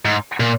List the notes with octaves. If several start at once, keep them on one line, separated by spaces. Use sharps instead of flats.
G#2
A#2